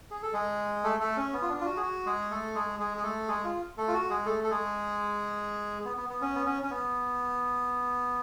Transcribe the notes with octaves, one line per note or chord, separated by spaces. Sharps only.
G#4
A4
G#3 G#4
A3 A4
A3 A4
C#4
B3
F4
D4
F4
F#4
G#4
F#4
G#3 G#4
A3 A4
G#3 G#4
G#3 G#4
G#4
A3 A4
G#3 G#4
F4
A3 A4
F4
F#4
G#3 G#4
A3 A4
A4
G#3 G#4
B3
B3
B3
C#4
B3
C#4
C#4
B3